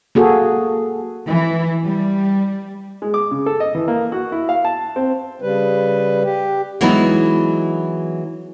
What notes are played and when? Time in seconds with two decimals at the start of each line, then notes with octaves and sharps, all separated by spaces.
0.15 A#3 F#4 G#4 A4
1.27 E3
1.84 G3
3.02 G#3
3.14 D6
3.31 C#3
3.46 A4
3.60 D#5
3.75 E3
3.88 A#3
4.12 F#4
4.32 E4
4.49 F5
4.65 A5
4.96 C4
5.42 C#3 G3 B4
6.24 G4
6.81 E3 F#3 G#3 B3 D#4 E4